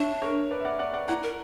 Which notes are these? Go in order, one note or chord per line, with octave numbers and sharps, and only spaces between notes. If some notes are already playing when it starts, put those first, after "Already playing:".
Already playing: D4 C#5 E5
A#4 C#5
B4 D5
E5
D5 F#5
D5 F#5
D5 F#5
E4 F#5 A#5
A#4